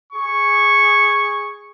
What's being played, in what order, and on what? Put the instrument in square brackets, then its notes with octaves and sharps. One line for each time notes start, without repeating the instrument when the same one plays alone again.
[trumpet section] G#4 C#6